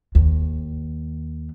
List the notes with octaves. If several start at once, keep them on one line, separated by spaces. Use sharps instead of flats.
D#2